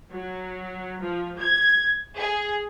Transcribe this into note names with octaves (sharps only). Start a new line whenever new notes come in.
F#3
F3
G#6
G#4